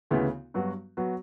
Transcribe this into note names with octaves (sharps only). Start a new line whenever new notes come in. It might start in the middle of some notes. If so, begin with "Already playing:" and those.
D2 C#3 E3 B3 E4
G2 F#3 B3 F#4
F#3 B3 F#4